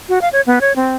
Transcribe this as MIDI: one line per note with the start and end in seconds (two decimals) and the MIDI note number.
0.09 0.21 66
0.21 0.29 77
0.33 0.41 73
0.47 0.59 59
0.61 0.75 73
0.76 0.97 60